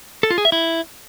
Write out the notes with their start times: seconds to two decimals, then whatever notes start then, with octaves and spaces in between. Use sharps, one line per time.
0.23 A4
0.30 F4
0.38 G#4
0.45 E5
0.52 E4